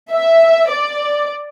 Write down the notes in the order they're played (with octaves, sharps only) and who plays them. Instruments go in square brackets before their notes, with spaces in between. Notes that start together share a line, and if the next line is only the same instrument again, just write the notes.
[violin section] E5
D5